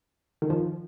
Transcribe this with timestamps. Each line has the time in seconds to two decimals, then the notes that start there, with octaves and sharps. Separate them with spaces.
0.42 D#3
0.50 F3